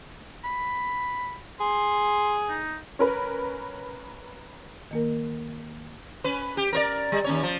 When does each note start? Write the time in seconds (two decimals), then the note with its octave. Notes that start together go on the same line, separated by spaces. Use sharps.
0.44 B5
1.60 G#4 C6
2.49 D#4
2.99 C#4 A#4 B4
4.91 D#3 A#3 A#4
6.24 C#4 B4
6.57 G4
6.73 A#4 C5 D5
7.12 G3
7.24 D#2 C#4 C#5
7.43 F3